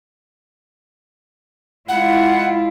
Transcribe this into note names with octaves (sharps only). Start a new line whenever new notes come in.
G#3 E4 F4 F#5